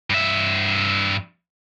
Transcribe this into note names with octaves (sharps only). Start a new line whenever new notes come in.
G2 E5